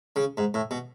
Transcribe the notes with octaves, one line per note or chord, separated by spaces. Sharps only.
C#3
G#2
A2
B2